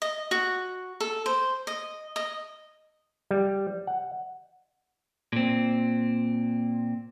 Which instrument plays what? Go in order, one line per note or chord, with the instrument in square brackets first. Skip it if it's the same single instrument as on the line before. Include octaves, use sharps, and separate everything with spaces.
[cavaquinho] D#5
F#4
A4
C5
D#5
D#5
[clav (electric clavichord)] G3
F#5
[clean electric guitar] A#2 C4